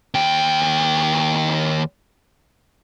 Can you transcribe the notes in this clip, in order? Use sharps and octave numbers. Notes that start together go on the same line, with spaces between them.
D#2 G5